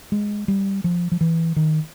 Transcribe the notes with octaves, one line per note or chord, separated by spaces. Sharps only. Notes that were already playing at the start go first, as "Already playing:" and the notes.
G#3
G3
F3
F3
E3
D#3